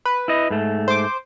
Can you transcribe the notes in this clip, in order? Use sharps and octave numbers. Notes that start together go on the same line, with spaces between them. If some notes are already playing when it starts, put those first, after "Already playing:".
B4
E4 D#5
G#2 A3
C5 D6